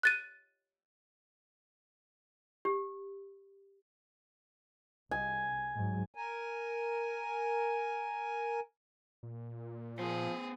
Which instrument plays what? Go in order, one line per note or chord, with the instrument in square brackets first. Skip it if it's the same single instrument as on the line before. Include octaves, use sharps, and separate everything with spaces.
[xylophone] F#6 A6 D#7
[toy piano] G4
[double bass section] C2 [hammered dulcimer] G#5
[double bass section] G#2 F#3
[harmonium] A#4 G#5
[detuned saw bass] A#2
[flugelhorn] F3 [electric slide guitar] B3 C5 [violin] G#4